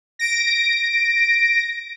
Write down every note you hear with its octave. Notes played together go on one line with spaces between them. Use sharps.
A#6 D7